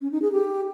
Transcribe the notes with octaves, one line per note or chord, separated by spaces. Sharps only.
C#4
D#4
G#4
G4